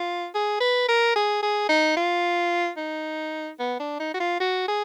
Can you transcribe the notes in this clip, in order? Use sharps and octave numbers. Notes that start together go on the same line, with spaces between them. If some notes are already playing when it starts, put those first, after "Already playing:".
Already playing: F4
G#4
B4
A#4
G#4
G#4
D#4
F4
D#4
B3
D4
D#4
F#4
F4
F#4
G#4